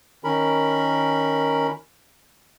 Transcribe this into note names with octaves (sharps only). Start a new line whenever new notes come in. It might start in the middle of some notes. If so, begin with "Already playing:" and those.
D#3 C#4 A#4 B5